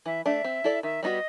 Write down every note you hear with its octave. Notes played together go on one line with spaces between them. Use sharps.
E3 E5
A3 D4 E5
C4
E4 A4 D5
D#3 E5
G3 B3 D#4 F#4 D#5